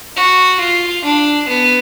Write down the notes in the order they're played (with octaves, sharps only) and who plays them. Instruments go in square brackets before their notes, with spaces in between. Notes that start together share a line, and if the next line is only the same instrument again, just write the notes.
[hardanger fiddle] F#4
F4
D4
B3